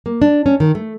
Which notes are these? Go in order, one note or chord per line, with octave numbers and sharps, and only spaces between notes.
A#3
D4
C#4
D#3
A3